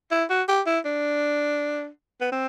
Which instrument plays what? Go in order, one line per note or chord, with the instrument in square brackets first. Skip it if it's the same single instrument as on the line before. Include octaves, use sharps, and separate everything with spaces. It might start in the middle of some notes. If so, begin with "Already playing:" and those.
[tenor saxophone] E4
F#4
G4
E4
D4
B3
C4